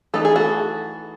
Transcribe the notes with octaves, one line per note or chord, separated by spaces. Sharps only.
E3 A3 D#4 A4
G#4
F#4 A4